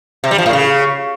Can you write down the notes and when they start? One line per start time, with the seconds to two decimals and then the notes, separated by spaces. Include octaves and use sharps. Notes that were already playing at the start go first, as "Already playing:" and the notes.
0.24 C3
0.31 G3
0.38 F3
0.46 A2
0.53 C#3